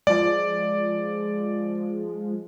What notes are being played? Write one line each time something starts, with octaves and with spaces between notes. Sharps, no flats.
F3 G#3 D5